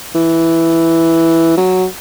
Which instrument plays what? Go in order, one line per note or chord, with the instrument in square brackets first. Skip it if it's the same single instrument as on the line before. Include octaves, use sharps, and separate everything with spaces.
[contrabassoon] E3
F#3